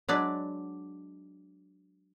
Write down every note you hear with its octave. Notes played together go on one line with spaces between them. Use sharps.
F#3 G#3 D4 B4 D5